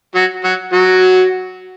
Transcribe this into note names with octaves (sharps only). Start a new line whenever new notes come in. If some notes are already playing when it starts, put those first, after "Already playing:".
F#3 F#4
F#3 F#4
F#3 F#4